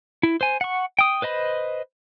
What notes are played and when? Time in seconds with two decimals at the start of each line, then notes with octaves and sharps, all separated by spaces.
0.23 E4
0.41 C5 G#5
0.61 F#5 C#6
0.99 G5 D#6
1.22 B4 C5 D#5 B5